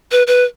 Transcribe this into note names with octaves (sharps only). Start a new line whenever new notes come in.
B4
B4